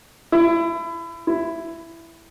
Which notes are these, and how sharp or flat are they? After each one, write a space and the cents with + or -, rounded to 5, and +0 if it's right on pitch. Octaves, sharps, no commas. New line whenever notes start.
E4 +25
E4 +10